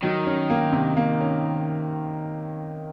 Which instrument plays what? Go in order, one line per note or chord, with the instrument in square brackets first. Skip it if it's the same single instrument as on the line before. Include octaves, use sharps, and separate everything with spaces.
[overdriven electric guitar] D#3 [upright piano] F#3
[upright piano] C#4
A#3
C3
A#3
C#4